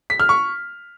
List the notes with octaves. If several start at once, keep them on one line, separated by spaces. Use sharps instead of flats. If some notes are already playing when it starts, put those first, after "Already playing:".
B6
F6
C#6